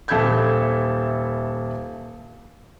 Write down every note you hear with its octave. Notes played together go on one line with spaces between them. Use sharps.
D#1 A4 E5 B5 G6 G#6